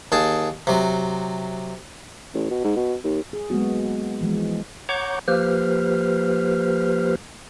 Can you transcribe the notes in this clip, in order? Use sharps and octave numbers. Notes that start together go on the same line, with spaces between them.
D#2 G#4 A5
C3 F#3
A1
B2
G#2
B2
D#2
G#4
F#3 G#3 A#3 B3 F#4
E3 F3 G#3
C#5 F#5 A#5 C#6 D6 G6
F3 A#3 G4 B4 C5 F6